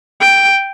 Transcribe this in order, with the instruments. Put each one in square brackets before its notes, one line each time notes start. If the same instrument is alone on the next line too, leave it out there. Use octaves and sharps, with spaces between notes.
[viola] G5